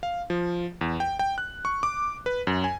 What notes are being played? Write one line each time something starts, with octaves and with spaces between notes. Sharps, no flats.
F5
F3
E2
G5
G5
F#6
C#6
D6
B4
F#2
G#5